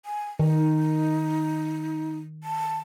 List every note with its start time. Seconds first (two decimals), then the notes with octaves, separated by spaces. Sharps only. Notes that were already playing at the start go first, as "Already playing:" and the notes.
0.05 G#5
0.40 D#3 D#4
2.43 A5